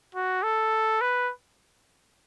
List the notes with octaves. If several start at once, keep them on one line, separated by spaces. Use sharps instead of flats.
F#4
A4
B4